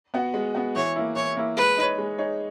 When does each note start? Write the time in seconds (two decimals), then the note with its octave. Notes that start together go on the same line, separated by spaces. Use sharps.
0.14 B3 F#4
0.34 G#3
0.55 B3 F#4
0.75 E3 C#5
0.96 A#3 E4
1.15 E3 C#5
1.37 A#3 E4
1.57 G#3 B4
1.78 D#4 G#4 C#5
1.98 G#3
2.18 D#4 G#4 C#5